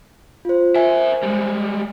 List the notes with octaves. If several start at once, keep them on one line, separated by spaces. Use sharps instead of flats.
F4 C5
A#4 C5 E5 G#5
G3 G#3